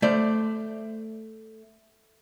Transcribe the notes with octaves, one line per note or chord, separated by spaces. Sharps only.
A3 C5 D5